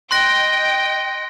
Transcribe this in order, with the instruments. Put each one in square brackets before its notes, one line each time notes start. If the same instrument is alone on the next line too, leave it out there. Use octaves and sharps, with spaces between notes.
[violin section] D#5 G5 [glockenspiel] C6 F#6 A#6